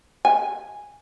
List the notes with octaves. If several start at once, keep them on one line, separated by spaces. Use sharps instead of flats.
G#5